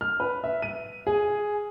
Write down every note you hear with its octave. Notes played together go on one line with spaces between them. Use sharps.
F6
B4
E5
D#7
G#4